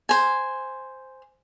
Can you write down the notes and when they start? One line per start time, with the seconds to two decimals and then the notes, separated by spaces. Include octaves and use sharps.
0.09 C5 G#5